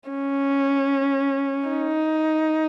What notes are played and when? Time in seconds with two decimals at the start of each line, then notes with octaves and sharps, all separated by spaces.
0.10 C#4
1.69 D#4